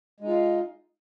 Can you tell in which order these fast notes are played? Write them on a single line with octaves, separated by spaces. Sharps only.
G#3 D#4 F4